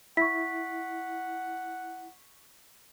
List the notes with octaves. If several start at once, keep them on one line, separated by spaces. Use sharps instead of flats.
E4 F#5 C#6 B6